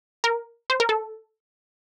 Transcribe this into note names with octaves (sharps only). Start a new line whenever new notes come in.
A#4
C5
A#4
A4